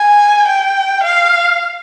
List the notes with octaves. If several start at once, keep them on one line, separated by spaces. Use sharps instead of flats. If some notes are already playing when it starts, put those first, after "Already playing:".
Already playing: G#5
G5
F5